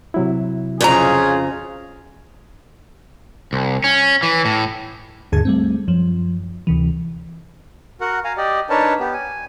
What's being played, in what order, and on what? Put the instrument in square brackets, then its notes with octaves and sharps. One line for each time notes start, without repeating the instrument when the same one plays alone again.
[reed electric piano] C3 F#3 E4
[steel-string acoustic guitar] F2 C#3 A#5 [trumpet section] C#4 F4 G#4
[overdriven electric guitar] C2
C#4
E3
A2
[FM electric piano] D#2 G#2 D3 G#4 A5 G#6
G3 A3 C4
F#2 F3
D2 C3 E3
[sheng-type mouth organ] F#4 A#4 F#5
F5 G#5 A#5
G4 D5 D#5
D4 D#4 A#4 B4 C#5 A5
B3 G4
G#5